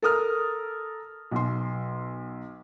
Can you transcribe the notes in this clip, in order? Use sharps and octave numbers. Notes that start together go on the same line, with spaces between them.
A4 A#4 D#6 F6
B1 C6